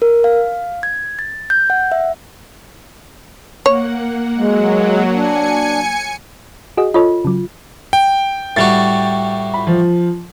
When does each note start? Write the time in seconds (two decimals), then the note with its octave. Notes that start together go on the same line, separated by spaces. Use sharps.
0.02 A#4
0.24 F5
0.83 G#6
1.19 A6
1.50 G6
1.70 F#5
1.92 E5
3.66 A#3 C#5 F#5
4.37 F#3 G#3
5.13 D4 G#5 C#7
6.77 F#4 G#4 D#5
6.94 F4 A4 C#5 D#5
7.25 C#3 F#3
7.93 G5
8.57 A2 G3 F#4 A6
9.54 B5
9.67 F3